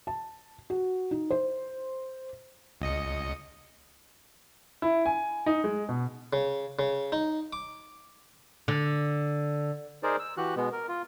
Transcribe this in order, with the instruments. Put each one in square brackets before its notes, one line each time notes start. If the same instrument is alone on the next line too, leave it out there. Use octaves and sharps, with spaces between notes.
[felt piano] A5
F#4
D#4
C5
[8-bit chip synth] C#2 D#5 C#7
[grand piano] E4
G#5
D#4
G#3
B2
[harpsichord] C#3
C#3
D#4
D6
[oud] D3
[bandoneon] D#4 G#4 A#4 C5 D5
E6
E3 F#4 G4 F#6
B2 G#3 B3
A#4
F4